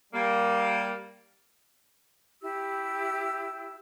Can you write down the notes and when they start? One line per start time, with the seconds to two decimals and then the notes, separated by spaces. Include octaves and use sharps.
0.13 G3 A#3
2.42 E4 G4 E6